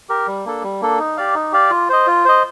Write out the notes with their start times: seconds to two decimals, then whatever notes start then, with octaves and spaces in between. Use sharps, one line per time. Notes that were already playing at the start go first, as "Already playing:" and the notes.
0.09 G4 A#4
0.27 G3
0.45 A#3 D4 A4
0.63 G3
0.81 A#3 D4 A4
0.99 D#4
1.17 G4 D5 F5
1.35 D#4
1.52 G4 D5 F5
1.71 F4
1.89 C5 D#5
2.07 F4
2.25 C5 D#5